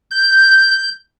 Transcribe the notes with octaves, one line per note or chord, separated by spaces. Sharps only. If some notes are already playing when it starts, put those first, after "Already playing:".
G6